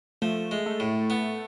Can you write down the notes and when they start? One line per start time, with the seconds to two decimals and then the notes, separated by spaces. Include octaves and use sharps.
0.22 F3 A3
0.51 G#3
0.66 A3
0.80 A2
1.10 B3